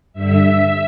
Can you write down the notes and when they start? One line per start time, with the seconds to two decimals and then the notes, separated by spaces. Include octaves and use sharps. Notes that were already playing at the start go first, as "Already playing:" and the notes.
0.13 G2 D3 E5